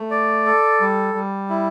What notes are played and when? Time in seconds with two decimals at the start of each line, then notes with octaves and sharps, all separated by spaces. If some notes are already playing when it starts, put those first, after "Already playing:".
Already playing: A3
0.11 D5
0.46 A4
0.80 G3
1.14 G3
1.50 E4